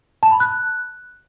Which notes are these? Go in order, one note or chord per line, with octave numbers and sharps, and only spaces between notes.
A5
B5
F#6